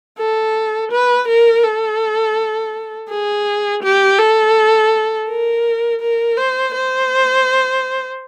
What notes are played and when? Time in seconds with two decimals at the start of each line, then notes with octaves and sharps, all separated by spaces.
0.18 A4
0.92 B4
1.28 A#4
1.64 A4
3.09 G#4
3.83 G4
4.19 A4
5.29 A#4
6.01 A#4
6.37 C5
6.74 C5